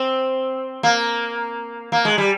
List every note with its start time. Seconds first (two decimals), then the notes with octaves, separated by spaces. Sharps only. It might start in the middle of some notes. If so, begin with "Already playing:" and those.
Already playing: C4
0.83 A#3
1.92 A#3
2.05 G#3
2.18 G3